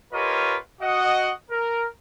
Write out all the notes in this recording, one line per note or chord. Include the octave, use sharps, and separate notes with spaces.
F4 G4 A#4 B4 C#5 D#5
F#4 D#5 F#5
A#4